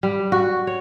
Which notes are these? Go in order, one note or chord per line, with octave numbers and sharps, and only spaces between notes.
G3
F#4
C#5